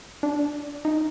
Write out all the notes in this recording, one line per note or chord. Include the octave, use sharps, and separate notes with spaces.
D4
D#4